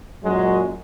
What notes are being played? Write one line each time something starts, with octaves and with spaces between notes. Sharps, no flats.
F#2 A#2 F#3 G#3